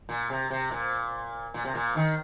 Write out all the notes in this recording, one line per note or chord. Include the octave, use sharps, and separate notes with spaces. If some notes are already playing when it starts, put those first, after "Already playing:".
A#2
C3
C3
A#2
A#2
C3
A#2
D#3